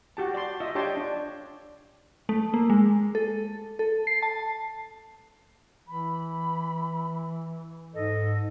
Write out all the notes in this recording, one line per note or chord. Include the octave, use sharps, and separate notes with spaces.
F#4 G4 A5
D5 C6
F4 D#5 E5
D4 G4 C#5 G5 A5 C6
D4
A3
A#3
G#3
A4
A4
C7
A5
E3 B5
G#2 A4 D#5